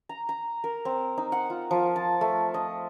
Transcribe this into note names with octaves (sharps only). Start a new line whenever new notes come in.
A#5
A#5
A#4
C4
D#4
F#5
F4
F3
A5
A3
D#5